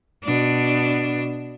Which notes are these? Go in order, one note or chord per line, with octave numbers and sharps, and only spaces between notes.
B2 D4